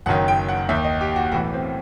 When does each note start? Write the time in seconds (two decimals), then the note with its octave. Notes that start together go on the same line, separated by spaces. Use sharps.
0.06 F#1 F#2 D#3 F#5
0.28 G5
0.49 F#5
0.69 D#2 D#3 E5
0.84 D#5
1.01 G4
1.16 F#4
1.32 B1 A2 E3 F#4
1.54 C4